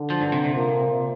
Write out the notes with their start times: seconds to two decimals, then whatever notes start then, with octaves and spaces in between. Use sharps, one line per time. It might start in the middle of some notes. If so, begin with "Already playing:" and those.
Already playing: D3
0.10 F3
0.21 G2
0.32 C3
0.44 C3
0.56 A#2